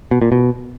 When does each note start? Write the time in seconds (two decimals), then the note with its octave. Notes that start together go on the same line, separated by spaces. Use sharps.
0.11 B2
0.22 A#2
0.32 B2